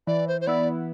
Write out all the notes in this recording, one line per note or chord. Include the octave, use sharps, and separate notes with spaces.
E3 D5
C5
C5
B3 E4 D5